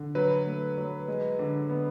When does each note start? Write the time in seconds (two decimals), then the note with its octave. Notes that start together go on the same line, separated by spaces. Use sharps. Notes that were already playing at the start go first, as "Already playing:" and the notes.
Already playing: D3
0.15 F#3 B4
0.46 A3
0.78 F#3
1.08 G#3
1.39 D3
1.69 B3